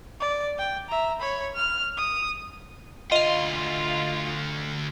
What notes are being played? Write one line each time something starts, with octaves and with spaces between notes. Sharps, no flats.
D5
G5
E5 A#5
C#5 B5
F6
D#6
D2 F4 D#5 F5 C6